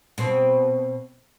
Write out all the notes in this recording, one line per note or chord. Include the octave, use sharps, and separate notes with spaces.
B2 C4